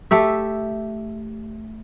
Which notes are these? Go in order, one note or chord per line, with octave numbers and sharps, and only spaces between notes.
A3 G4 E5